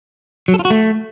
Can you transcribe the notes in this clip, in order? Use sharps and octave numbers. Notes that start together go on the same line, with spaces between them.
F#3
A4
F4
F#4
A3